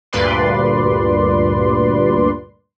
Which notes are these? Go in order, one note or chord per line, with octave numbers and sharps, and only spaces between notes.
D2 G2 A#2 B4 D5 C6